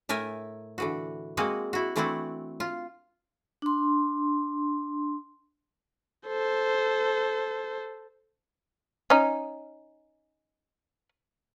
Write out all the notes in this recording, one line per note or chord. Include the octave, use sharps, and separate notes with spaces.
A2 A3 A#4 E5 G#5
D3 E3 F#4
G#3 A#3 C4 F#4 G#4
E4 F#4
E3 A3 C4 D4 E4 F#4
F4
D4 C6
A4 C5
C#4 D#4